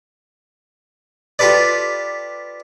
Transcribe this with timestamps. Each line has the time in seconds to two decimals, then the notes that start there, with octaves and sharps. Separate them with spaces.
1.39 F4 G4 A4 B4 D5